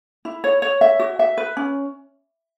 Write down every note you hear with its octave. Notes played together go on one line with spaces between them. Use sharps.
E4
C#5
C#5
E5
F#4
E5
B4
C#4